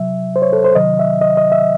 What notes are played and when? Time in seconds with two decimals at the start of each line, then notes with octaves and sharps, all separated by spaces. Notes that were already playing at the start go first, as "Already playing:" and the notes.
Already playing: C3 F#3 E5
0.36 C5
0.42 C#5
0.53 A4
0.64 C5
0.75 C3 D#3 F#3 D#5
0.99 E5
1.21 D#5
1.37 D#5
1.52 E5